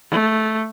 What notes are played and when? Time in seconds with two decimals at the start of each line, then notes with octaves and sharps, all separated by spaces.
0.10 A3